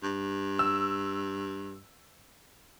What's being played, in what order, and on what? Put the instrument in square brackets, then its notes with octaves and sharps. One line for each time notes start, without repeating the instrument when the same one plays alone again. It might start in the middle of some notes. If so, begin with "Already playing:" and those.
[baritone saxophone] G2
[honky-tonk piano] E6